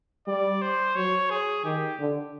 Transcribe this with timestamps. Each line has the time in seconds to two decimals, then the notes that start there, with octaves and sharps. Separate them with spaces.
0.27 G3 D5
0.62 C5
0.96 F#3 C#5
1.30 G#4
1.64 D#3 G4
1.99 D3